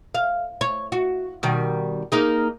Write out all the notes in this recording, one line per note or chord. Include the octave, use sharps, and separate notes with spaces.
F5
C#5
F#4
B2 D#3 G3
A#3 D#4 G#4